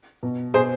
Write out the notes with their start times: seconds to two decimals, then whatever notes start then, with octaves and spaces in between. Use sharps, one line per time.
0.23 B2
0.54 B2 G#4 C5